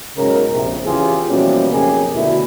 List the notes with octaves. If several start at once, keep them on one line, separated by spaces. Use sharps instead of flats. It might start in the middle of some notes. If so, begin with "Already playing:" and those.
B1 G#2 C#3 A#4
A#1 F2 C3
E2 C#3 E3 F4 G4 G#4
B2 E3 F3 G3 A#3 C#4
B1 F2 C#3 A#3 G4 G#4
D2 B2 E4